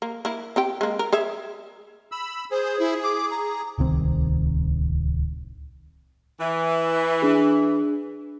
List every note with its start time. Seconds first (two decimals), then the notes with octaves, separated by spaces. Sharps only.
0.02 A#3
0.25 A#3 E4
0.56 C4 G4 G5
0.81 G#3 A#3
0.99 A#4
1.12 G#4 C#5 E5
2.12 B5 E6
2.51 G#4 C5
2.79 E4
3.04 D6
3.31 A#5
3.78 D1 C2 D#3 C4
6.40 E3
7.22 D4 G#4